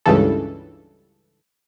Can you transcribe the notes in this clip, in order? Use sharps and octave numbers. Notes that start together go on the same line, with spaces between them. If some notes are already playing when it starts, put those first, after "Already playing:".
C#2 G2 C#3 E3 A4